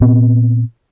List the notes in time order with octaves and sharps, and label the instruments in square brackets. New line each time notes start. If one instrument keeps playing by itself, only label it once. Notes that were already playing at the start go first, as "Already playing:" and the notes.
[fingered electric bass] A#2 B3 C4